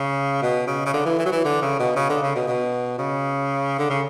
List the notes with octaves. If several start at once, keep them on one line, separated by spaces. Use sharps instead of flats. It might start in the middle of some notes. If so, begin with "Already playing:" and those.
Already playing: C#3
B2
C#3
C#3
D3
E3
E3
F#3
E3
D3
C#3
B2
C#3
D3
C#3
B2
B2
C#3
D3
C#3